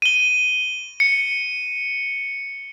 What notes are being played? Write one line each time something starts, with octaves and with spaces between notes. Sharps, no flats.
D#7 G7
C#7